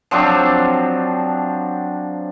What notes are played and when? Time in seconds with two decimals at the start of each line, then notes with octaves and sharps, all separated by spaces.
0.11 F3 F#3 C4 D4